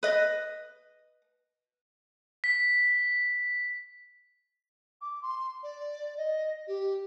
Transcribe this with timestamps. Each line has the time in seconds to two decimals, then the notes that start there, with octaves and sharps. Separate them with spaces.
0.03 B4 D#5
2.44 B6
5.01 D6
5.22 C6
5.63 D5
6.17 D#5
6.67 G4